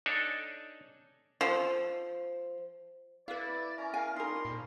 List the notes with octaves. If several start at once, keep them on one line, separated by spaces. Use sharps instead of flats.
D4 D#4 A4 C#5 D5 G#5
F3
E4 B4 D5 F5
C#4 A#4
A#4 F5 G#5
F3 G3 D#4 A#4 C6
A#2